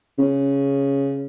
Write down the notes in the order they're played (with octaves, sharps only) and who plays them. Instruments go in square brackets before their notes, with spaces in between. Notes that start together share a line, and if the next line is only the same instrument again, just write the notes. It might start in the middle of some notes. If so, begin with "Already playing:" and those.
[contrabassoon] C#3